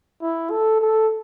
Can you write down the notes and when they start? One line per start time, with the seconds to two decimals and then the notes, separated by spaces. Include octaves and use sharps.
0.22 E4
0.51 A4
0.81 A4